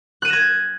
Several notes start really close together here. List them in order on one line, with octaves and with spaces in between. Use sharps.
F#6 D#7 E7 A#6 G#6